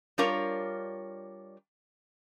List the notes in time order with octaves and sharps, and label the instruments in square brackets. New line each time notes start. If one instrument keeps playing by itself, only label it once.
[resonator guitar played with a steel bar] G3 D4 F4 A#4 C#5